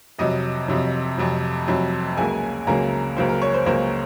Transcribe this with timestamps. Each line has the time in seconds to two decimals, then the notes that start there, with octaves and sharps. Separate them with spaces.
0.19 F2 C3 F#3 D#5
0.68 F2 C3 F#3
1.18 F2 C3 F#3
1.68 F2 C3 F#3
2.17 C#2 C#3 F#3 A#3 G#5
2.67 C#2 C#3 F#3 A#3 A#5
3.17 C#2 C#3 F#3 A#3 C5
3.29 A#4
3.42 C#5
3.54 C5
3.66 C#2 C#3 F#3 A#3 C5